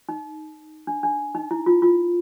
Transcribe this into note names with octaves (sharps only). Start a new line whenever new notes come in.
D#4
D4
D4
D#4
E4
F4
F4